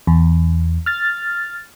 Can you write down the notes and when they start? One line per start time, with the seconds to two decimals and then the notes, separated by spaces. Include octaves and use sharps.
0.07 E2
0.86 F6 A6